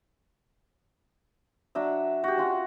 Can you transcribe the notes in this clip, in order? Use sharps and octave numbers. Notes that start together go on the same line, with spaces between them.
F#3 D4 E5
F#4 G4
C#4 F4 F#4